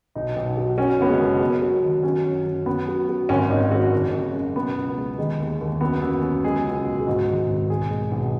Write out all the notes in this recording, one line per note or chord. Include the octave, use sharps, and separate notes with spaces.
B1 D#4
B1
F#3
F#3 C#4
F#1 B3
G#3
F#1
F#3
F#3
D#3
F#3 C#4
F#2
F#2
F#2 B3
F#3
F#3
G#1 C#4
G#1 D#4
G#3 F#4
F#1
C#3
F#2
B2 B3
C#2
G#3
D#3 G#3
D#2
D#2
F#2 B3
F#2
F#2
G#3 G#4
C#2
B2
G#4
G#2 F#4
D#3
G#1
B1 G#4
G#3
B1